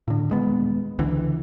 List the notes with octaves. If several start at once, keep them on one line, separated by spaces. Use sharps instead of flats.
A2 D3
D#1 G#3 B3
C#2 D3 E3